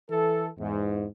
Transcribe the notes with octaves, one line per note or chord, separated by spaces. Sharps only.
E3 A4
E2 G#2